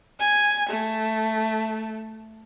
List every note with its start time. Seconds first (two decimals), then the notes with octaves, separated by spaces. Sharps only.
0.20 G#5
0.70 A3